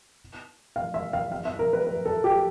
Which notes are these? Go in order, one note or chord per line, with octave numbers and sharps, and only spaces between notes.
F5
E5
F5
F5
E5
A#4
B4
B4
A4
G4